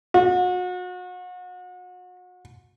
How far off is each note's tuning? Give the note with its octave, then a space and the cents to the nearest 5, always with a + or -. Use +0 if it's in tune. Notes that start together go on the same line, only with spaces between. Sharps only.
F#4 -35